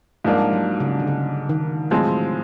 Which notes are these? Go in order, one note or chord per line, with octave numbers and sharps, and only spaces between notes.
G#2 F3 G3 A#3 D4
F#3
C#3
D3
C#3
D#3
A2 F3 F#3 G#3 C4